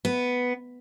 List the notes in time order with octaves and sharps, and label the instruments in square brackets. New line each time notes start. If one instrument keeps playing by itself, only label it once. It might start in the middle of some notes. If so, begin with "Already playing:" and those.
[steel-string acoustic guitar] B3